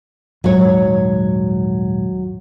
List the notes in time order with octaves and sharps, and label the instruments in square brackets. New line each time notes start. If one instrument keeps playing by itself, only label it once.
[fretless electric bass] D#1 G#2 [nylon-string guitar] F#3 C#5